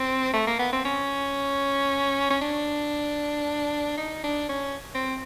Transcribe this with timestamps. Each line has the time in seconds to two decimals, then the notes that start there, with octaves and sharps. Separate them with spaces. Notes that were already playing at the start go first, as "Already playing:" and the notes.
Already playing: C4
0.34 A3
0.47 A#3
0.59 B3
0.73 C4
0.85 C#4
2.30 C#4
2.41 D4
3.97 D#4
4.24 D4
4.49 C#4
4.95 C4